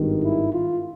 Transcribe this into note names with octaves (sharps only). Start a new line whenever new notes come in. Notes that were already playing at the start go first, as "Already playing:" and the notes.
Already playing: G#1 G2 D#3
E4
F4